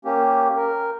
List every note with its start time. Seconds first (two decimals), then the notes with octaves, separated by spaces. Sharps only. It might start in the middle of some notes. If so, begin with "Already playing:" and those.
0.05 A#3 C#4 G4
0.56 A#4